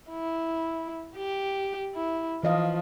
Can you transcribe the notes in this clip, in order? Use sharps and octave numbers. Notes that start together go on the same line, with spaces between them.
E4
G4
E4
E3 F3 D#5 F5